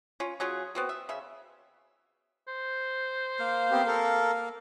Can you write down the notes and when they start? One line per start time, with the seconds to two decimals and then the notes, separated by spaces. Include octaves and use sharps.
0.20 C#4 F4
0.40 F#3 C#4 F4 G#4
0.75 B3 C4 F#4
0.89 E5
1.09 C#3 E5
2.47 C5
3.39 A#3 F5
3.71 B3 C4 G4
3.87 A4 A#4